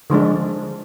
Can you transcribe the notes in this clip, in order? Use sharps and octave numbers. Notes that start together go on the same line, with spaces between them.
D3 F3 G#3 D4